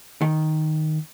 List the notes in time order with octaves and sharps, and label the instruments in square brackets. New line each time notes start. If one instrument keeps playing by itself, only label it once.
[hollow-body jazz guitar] D#3